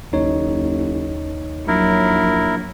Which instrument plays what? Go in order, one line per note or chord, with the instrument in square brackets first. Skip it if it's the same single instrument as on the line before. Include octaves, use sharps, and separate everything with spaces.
[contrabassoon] F#1 [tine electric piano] D#2 D#4 C#5
[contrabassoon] A#1 [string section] F#3 [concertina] E4 A#4